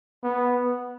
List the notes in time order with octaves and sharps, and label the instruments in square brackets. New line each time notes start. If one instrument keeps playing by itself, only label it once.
[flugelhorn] B3